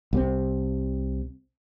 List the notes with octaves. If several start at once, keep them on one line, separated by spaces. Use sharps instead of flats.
C2 C3 C4